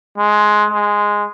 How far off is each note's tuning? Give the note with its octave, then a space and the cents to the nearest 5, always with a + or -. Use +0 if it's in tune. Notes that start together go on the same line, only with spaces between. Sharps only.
G#3 +15
G#3 -5